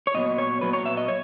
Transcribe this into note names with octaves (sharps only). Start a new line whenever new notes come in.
C#5
A#2 F#3 B3 D#5
C#5
A#2 F#3 B3 B4
C#5
E5
D#5
C#5